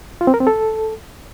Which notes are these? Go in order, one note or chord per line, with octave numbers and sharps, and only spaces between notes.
F4
C4
A#4
C4
A4